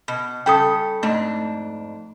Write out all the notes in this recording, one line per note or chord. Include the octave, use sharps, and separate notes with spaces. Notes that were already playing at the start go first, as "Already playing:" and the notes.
B2
C#3 G3 A4 G5 D#6
F2 G#2 A3 D4